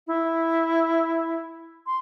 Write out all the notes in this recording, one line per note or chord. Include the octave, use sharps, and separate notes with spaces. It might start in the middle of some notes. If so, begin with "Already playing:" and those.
E4
C6